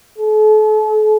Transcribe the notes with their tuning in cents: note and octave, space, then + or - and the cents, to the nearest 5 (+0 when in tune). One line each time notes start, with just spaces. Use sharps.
A4 -40